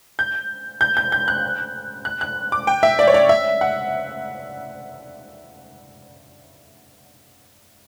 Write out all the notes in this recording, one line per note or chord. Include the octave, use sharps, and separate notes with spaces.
G6
G6
G6
G6
F#6
F#6
F#6
D6
G5
E5
D5
C#5
D5
E5
F#5